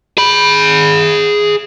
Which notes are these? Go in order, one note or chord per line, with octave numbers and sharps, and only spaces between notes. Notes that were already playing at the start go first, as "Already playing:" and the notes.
G#4 B5